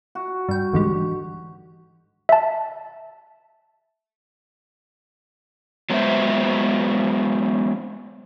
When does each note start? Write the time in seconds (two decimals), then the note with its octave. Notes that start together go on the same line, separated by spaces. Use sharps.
0.15 F#4
0.49 G2 G5
0.73 D2 G#2 E3 G3 D4
2.29 E5 A5
5.90 F#3 G#3 B3 F#4 C5 E5